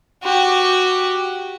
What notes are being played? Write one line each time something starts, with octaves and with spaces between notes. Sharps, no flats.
F#4 G4